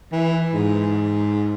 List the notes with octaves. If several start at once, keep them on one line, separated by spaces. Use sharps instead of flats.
E3
G#2